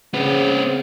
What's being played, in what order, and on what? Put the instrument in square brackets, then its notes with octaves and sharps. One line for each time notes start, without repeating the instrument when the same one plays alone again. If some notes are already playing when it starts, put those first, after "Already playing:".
[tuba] C#3 [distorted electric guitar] C4 B4